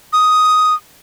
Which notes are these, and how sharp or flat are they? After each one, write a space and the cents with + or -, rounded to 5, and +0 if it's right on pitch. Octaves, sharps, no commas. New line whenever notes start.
D#6 +5